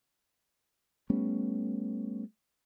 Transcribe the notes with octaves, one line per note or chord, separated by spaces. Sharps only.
G3 A3 B3 C#4